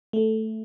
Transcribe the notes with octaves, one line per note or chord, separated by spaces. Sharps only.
A3